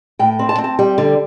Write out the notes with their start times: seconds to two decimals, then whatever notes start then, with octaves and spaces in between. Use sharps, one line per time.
0.19 A2 G5
0.39 C4
0.49 A5
0.58 C4
0.64 A5
0.79 G3 G5
0.98 D3